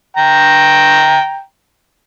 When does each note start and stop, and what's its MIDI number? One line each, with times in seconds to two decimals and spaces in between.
0.17 1.42 79
0.17 1.42 82